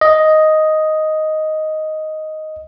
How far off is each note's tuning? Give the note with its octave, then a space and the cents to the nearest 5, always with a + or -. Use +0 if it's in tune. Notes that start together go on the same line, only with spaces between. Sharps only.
D#5 +5